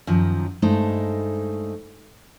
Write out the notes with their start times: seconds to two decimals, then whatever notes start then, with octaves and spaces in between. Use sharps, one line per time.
0.07 F#2 D#3 F3
0.62 G2 G#3 A3 D#4 C5